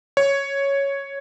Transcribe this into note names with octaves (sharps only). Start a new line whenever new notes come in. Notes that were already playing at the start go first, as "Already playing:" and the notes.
C#5